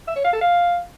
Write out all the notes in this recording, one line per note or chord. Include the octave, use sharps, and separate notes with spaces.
E5
C#5
F5
A4
F5